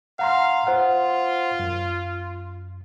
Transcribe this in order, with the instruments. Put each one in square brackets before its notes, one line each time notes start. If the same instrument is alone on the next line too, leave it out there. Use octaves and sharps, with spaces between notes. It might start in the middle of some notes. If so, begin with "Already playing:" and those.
[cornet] F5 [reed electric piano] F#5 A#5 C6
[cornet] F4 [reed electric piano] C5 F#5
[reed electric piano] F#2